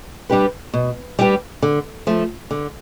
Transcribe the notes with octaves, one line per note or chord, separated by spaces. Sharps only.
G3 D4 G4 B4
B2
G3 D4 G4 B4
D3
F3 A3
D3